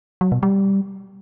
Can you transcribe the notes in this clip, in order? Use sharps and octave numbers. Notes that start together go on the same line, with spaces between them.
F#3
B2
G3